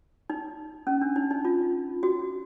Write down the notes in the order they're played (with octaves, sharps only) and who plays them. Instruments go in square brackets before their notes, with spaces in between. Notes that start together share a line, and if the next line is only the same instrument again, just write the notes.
[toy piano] D#4
C#4
D4
D#4
D#4
F4
F#4